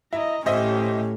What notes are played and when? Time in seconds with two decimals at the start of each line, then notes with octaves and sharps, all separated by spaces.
0.13 E4 D#5 A#5
0.46 A2 C#4 G4 C5 D#5 E5